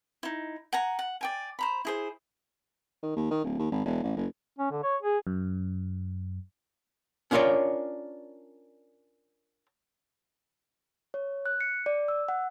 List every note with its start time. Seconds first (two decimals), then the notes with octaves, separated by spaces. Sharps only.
0.23 D#4 E4
0.73 F#5 G#5 A#5
0.99 F#5
1.21 D5 G5 G#5
1.59 C5 A#5 B5
1.85 E4 G#4 C5
3.03 D#3
3.16 D#2
3.31 D#3
3.44 D1
3.59 D#2
3.72 G#1
3.85 E1
4.03 A1
4.16 F#1
4.59 C#4
4.71 D3
4.83 C#5
5.03 G#4
5.27 F#2
7.31 C#4 D4 F4 A#4 C#5 D5
11.14 C#5
11.46 F#6
11.61 C#7
11.86 D5
12.08 E6
12.28 F#5